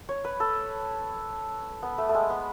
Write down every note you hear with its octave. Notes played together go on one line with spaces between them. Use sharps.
C#5
B4
A4
B3
A3
A3
G#3
B3